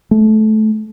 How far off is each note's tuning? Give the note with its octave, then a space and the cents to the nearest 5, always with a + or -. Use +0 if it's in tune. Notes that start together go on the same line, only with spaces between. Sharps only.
A3 -20